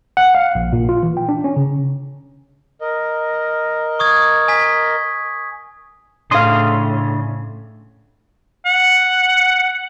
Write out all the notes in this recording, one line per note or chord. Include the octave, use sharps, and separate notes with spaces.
F#5
F5
A#1
A#2
F4
E3
G5
D4
C#4
C#3
A#4 D#5
C#6 D#6 G#6
G#5 B6
A2 C#3 D4 F5 C6 D#6
F#5